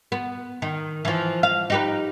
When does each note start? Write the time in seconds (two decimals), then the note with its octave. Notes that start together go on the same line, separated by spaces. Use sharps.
0.12 B3
0.62 D#3
1.05 E3 F3
1.43 F5
1.70 D#4 G4 B4